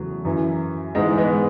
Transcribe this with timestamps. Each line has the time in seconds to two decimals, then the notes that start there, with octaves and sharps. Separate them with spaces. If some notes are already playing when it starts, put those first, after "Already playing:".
Already playing: E2 C#3 E3 F#3 A3
0.25 F#2 E3
0.95 G#2 E3 G#3
1.18 G#3 B3